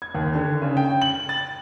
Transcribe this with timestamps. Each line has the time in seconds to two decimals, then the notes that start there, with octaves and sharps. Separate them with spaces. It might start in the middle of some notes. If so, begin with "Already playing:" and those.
0.02 G#6
0.15 D#2
0.35 D3
0.62 C#3
0.77 G5
1.01 F#7
1.29 A6